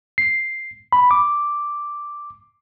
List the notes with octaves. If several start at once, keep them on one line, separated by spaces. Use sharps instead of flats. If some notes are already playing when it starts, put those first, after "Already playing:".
C7
B5
D6